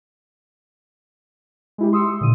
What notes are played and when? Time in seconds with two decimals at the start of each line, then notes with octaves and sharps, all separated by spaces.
1.78 G#3 E4 G4
1.93 C6 D#6 E6 C#7
2.21 A#2 D3 D#7